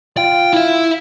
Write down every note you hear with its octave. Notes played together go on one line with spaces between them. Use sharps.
F4 G5
E4 E5